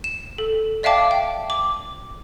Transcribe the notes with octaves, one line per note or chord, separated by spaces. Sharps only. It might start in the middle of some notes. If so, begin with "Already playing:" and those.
E7
A4
D5 E5 F5 G5 A5 D6
G5
D6